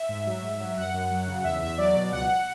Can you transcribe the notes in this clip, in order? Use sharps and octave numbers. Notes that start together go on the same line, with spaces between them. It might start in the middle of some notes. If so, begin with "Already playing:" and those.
Already playing: E5
G#2
F#3
G#2
F#3
F#2 F#5
F#2
F#3
C#3
E2 E5
E2 E5
F#3 D5
B2
C#2 F#5